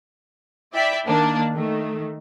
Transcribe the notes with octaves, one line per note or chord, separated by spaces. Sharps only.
E4 D5 E5 G5
D#3 A#3 D4
D#3 A3